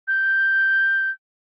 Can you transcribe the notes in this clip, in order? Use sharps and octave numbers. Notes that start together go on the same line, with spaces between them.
G6